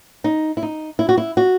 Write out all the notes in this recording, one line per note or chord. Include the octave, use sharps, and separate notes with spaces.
D#4
E4
D#4
E4
F#4
E4
F#4